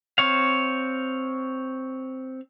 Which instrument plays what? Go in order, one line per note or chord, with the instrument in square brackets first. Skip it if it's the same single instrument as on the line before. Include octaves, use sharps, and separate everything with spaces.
[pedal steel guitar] C4 C#5 F5